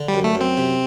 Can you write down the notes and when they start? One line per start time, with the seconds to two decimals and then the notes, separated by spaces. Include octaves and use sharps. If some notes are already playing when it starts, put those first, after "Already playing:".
Already playing: D3
0.08 G3
0.14 F#2
0.24 A3
0.35 F#2
0.41 C4
0.57 C3